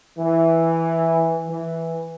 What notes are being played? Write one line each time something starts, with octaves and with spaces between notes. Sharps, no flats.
E3
E3